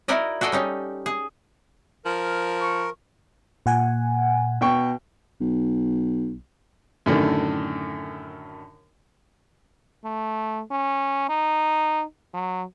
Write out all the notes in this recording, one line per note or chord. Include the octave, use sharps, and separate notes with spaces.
D#4 E4 F#4 A#4 D5 D#5
F#4 G#4 A4 D5 D#5
G3 C#4 D#4
G#4
F3 A#4
C#6
A#2 F#5 G#5
B2 G5 C#6
B1
F#2 A2 D3 D#3
A3
C#4
D#4
F#3